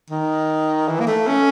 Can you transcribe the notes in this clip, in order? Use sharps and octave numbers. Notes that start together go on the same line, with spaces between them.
D#3
E3
A#3
A3
C#4